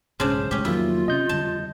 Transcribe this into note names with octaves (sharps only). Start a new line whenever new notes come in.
B1 G#2 C#3 D4 C5 C6
C2 A2 G#3 C#4 G4
F2 D#3 F3 F#3 A#3 E4 F4
C3 C#4 D#5 G6
F2 D3 G3 A5